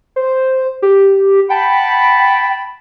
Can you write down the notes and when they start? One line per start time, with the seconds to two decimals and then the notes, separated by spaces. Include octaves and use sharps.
0.16 C5
0.82 G4
1.50 F#5 G5 A5 B5